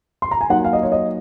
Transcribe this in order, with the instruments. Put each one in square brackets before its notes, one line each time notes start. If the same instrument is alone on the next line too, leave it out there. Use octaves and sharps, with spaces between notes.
[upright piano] C6
A#5
G#5
[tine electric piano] F#3 A#3 D#4 F#4 [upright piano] F#5
[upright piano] F5
D#5
C#5
D#5